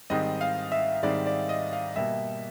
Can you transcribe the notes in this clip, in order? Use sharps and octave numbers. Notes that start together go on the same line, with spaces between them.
G#2 D#3 G3 C4 D#5
F5
E5
G#2 D#3 G3 C4 D5
D5
D#5
F5
B2 G3 A#3 E5